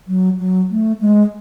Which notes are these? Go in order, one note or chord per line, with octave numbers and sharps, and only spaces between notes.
F#3
F#3
A3
G#3